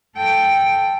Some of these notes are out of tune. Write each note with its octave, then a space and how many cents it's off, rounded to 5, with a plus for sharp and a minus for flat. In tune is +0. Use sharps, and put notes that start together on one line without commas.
A4 +0 G5 +0